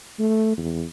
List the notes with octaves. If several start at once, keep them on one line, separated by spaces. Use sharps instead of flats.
A3
E2